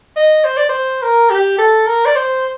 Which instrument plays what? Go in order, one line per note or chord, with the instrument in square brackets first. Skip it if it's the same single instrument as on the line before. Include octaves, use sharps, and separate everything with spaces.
[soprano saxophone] D#5
C5
D5
C5
A#4
G4
A4
A#4
D5
C5